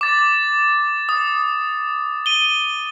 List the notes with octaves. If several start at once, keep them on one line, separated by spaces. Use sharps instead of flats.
D6 A6
D#6
D#7 G7